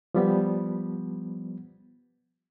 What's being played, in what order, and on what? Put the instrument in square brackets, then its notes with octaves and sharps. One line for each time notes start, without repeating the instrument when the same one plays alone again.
[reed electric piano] F3 G3 B3